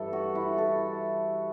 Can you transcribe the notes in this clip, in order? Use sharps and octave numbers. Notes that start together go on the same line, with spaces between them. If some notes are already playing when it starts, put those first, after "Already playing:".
Already playing: G2 E3 A4
F#4
E4
A4